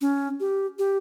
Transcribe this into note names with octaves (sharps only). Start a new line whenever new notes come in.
C#4
G4
G4